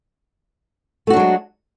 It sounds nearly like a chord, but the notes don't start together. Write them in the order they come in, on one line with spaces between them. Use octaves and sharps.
A3 F#4 D4 F#3 G#3